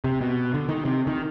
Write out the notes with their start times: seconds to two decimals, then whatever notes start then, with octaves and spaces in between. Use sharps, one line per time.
0.04 C3
0.21 B2
0.54 D3
0.69 D#3
0.85 C3
1.07 D#3